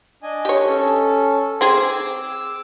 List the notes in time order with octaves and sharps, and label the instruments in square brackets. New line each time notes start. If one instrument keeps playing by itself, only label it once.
[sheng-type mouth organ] D4 D#5 G#5
[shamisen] G4 C#5
[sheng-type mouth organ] C#4 A4
[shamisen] C4 G#4 [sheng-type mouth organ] D6 E6